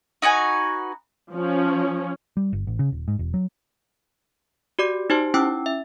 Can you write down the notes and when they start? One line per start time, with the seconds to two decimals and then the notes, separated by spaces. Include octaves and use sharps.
0.22 D#4 F#4 B4 G#5
1.31 F3 C#4
2.37 G3
2.53 G1
2.67 A1
2.79 C#3
2.92 D#1
3.08 G#2
3.19 E1
3.34 F#3
4.79 F#4 G4 D5 D6
5.10 D#4 G4 C5 A5
5.34 C#4 E4 G5 D6 E6
5.66 E5